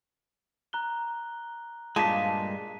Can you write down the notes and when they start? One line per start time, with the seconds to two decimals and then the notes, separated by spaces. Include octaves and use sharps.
0.73 A#5 F#6 G7
1.96 G2 A#2 G#3 F4 A5 B6 D#7